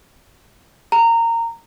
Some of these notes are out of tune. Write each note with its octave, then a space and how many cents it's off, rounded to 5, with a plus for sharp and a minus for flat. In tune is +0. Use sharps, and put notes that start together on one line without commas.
A#5 -20